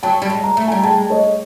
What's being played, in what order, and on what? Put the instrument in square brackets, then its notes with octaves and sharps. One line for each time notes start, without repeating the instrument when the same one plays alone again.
[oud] F#3 [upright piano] G5 A5
[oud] G3
G#3
[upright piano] A#5
[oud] A3
[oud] G3 [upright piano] G#5 A#5
[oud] G#3 [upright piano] G5 A5
[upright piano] C#5 D#5